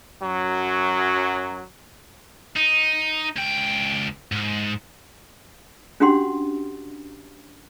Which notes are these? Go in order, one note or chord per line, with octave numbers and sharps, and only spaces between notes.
F#2 F#3
D#4
C#2 G5
G#2
C#4 D4 F#4 G4 F#5 C6